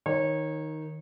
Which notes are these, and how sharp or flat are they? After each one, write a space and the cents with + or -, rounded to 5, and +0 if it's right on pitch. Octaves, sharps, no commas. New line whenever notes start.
D#3 +5 C#5 -25